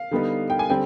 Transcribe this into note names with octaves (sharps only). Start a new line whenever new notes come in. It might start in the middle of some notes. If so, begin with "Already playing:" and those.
Already playing: F5
D3 G3 B3 D#4
G5
G#5
D3 G3 C4 G5